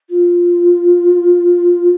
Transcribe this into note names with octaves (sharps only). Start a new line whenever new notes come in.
F4